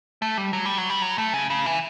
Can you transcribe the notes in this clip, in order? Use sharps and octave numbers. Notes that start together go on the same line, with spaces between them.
A3
G3
F#3
G3
F#3
G3
F#3
A3
C#3
C#3
E3